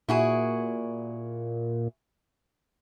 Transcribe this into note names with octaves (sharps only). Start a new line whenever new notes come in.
A#2 E4 F#4 G#4